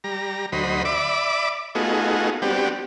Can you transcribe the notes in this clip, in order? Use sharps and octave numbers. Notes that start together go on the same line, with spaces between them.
G3 A#5
D2 F#3 C5 D#5 B5
D5 E5 B5 D6
A3 B3 D#4 F4 F#4 G#4
G3 B3 C4 D4 F#4 G4